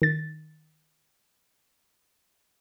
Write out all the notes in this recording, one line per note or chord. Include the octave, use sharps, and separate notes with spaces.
D#3 A6